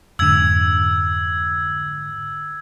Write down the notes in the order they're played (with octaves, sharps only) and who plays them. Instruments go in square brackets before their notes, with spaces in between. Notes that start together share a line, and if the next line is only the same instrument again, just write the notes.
[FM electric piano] F2 G#2 D3 [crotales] E6 G#6